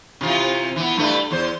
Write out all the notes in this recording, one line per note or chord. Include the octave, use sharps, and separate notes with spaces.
C3 E3 F4
E3 B3
G2 A3 B4
E2 C5